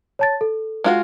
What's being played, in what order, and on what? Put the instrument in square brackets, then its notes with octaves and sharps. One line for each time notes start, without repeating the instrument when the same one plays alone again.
[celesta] C#5 A5 A6
A4
[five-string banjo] G#3 F4 F#4